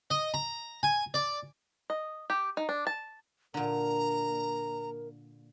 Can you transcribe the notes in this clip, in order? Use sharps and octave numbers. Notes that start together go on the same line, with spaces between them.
D#5
A#5
G#5
D5
D#5
G4
D#4
D4
A5
A#2 D3 A#4 A#5